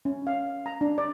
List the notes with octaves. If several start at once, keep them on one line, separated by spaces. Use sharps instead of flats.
C#4
F5
A#5
D4
D5